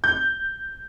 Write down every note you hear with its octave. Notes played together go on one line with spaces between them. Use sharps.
G6